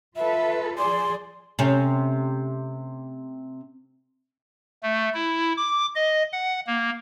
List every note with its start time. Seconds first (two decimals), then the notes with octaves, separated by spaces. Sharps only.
0.16 F4 A4 B4 E5
0.78 F3 G#4 D5 C6
1.59 C3 A3 C#4
4.83 A3
5.14 E4
5.57 D6
5.95 D#5
6.33 F#5
6.67 A#3